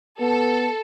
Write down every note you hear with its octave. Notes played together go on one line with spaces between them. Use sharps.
B3 A4